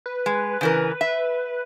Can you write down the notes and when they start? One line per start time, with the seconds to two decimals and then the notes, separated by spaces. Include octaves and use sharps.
0.06 B4
0.26 G#3
0.61 C#3 E3 A#4
1.01 E5